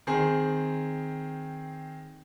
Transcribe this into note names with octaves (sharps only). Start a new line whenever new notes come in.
D#3 C4 G#4